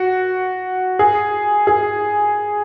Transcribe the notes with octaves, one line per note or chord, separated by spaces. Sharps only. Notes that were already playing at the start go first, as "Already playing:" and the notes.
Already playing: F#4
G#4
G#4